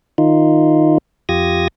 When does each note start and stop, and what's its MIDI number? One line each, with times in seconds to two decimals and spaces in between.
0.18 0.98 51
0.18 0.98 63
0.18 0.98 65
1.29 1.68 41
1.29 1.68 65
1.29 1.68 67
1.29 1.68 87
1.29 1.68 92
1.29 1.68 94